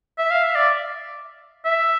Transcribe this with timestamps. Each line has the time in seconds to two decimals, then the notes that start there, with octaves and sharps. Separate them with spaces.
0.18 E5
0.31 F5
0.44 E5
0.56 D5
1.65 E5